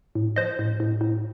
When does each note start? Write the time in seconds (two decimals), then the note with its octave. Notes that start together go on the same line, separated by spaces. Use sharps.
0.15 A2
0.36 F3 C5 D#5
0.59 A2
0.80 A2
1.01 A2